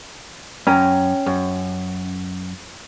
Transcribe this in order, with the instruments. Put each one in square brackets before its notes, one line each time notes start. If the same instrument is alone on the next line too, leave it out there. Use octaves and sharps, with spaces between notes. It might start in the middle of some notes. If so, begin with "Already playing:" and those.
[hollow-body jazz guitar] F#2 [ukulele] C#4 G5 A#5
[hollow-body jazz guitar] F#2